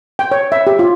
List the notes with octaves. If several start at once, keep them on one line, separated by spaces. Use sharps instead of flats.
G5
C#5
E5
G4
F4